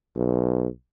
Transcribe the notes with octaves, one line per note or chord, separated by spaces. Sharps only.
B1